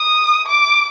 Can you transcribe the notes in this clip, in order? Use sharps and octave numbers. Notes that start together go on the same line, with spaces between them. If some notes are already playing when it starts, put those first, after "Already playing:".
Already playing: D#6
D6